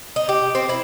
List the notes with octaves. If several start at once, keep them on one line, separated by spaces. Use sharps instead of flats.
D#4
G4
C4
E4